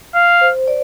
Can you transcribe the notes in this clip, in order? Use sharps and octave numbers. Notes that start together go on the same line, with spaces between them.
F5
C5
D5